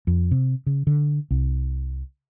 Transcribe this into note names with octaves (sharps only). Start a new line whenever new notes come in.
F2
C3
C#3
D3
C2